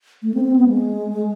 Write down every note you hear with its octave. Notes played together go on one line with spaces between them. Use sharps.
A3
C4
C4
B3
G#3